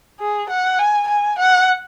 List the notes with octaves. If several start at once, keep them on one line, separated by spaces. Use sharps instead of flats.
G#4
F#5
G#5
G#5
F#5